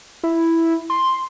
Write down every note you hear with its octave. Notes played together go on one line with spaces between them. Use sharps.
E4
C6